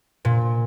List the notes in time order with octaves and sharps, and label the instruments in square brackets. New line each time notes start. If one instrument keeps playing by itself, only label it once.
[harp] A#2